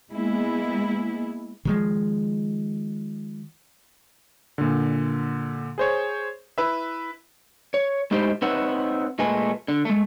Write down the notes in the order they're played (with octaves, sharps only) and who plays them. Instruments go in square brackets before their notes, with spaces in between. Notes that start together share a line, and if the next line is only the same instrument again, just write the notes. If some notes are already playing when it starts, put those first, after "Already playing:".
[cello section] G#3 A#3 B3 E4
[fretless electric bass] D#3 F3 G#3
[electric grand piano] A#2 D3
G#4 C5 C#5
E4 B4 E5
[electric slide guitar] C#5
A2 G#3 D#4 E4 G4 C5
C4 D#4 B4 C#5 E5 F#5
A#2 G#3 A3 B4 G#5
D3
G#3 A3